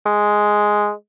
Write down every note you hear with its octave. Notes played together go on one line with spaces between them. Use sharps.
G#3